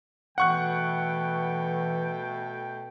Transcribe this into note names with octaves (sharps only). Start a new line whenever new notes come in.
B2 E3 A3 F#5 G5 C#6 F#6